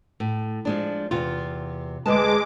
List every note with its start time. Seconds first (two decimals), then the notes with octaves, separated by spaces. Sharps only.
0.20 A2
0.65 F3 G#3 D4
1.11 E2 C3 F4
2.06 D2 G#3 B4 A5 D6